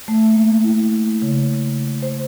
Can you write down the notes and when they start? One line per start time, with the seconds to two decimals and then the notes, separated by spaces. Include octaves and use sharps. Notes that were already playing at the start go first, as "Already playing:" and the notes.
0.08 A3
0.34 A#3
0.64 E4
1.22 C#3
2.02 C5